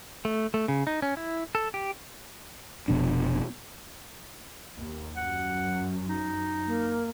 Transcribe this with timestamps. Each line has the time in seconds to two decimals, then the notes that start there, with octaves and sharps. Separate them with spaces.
0.25 A3
0.54 A3
0.68 C#3
0.87 D#4
1.02 C#4
1.17 E4
1.55 A4
1.74 G4
2.88 F1 B2 F3 D4
4.77 D#2
5.17 F#2 F#5
6.09 D#4
6.67 A#3